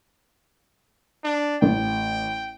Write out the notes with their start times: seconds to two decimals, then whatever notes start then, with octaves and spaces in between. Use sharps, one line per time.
1.24 D4
1.62 A1 G5